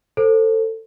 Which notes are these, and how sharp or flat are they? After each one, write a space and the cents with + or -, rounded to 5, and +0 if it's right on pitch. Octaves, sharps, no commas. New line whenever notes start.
A4 +20 C5 +15